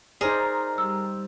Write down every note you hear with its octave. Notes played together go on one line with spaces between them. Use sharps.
D#4 G#4 A#4 C5 D5
G3 E6